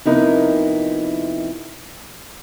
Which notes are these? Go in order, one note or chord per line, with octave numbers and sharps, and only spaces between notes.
F2 C3 B3 D#4 E4 A#4